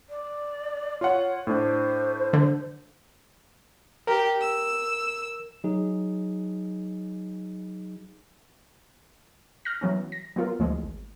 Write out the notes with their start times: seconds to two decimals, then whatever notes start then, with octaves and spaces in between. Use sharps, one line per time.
0.10 D5
1.01 F4 C#5 F#5
1.47 A2 D4 C5
2.33 D3
4.07 G4 A#4
4.41 E6
5.64 F#3 D#4 G#4
9.65 F6 F#6 A#6
9.81 E3 F#3 B3 C#4
10.12 A#6
10.36 F#3 B3 F4 A#4
10.59 D2 E3 F3 G3 G#3
10.83 G#1